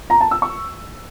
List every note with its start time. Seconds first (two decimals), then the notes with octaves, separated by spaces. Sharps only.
0.10 A#5
0.21 A5
0.31 E6
0.42 C#6